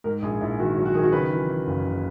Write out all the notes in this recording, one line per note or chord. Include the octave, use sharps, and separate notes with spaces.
G#2 A#4
A#1 G#4
A#1 E4
D#3 F#4
F#3
F#4
D#3 G#4
F#4
C#3 B4
E3
E3
F#1
C#3